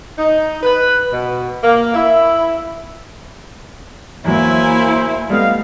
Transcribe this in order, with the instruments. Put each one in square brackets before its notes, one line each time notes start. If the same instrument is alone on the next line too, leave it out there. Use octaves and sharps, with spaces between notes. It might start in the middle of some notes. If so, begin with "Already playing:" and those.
[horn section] D#4
B4
B2
A#3
E4
[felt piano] E2 F#3 [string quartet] A#3 E4 G#5 [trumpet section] C5 E5
[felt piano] G3 A3 B3 [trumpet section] D#5 F5